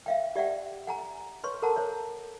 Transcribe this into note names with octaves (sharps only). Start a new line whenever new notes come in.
E5 F5 G5
G4 D5 E5 F#5 G5
F#5 G#5 A#5
B4 C#5 C6 C#6
A4 A#4 C5 F#5 A5 A#5
C5 C#5